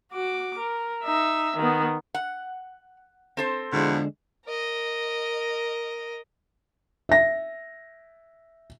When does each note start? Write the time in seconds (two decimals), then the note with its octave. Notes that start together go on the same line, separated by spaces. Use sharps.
0.13 F#4 D6
0.59 A#4
1.04 D#4 E5
1.57 D#3 B3
2.14 F#5
3.37 C4 A4 C5
3.73 E2 B2 D3 F3 G#3 D4
4.45 A#4 D#5
7.09 E5 A#6